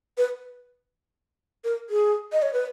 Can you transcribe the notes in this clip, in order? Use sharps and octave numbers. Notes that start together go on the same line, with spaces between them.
B4
A#4
G#4
D#5
C#5
B4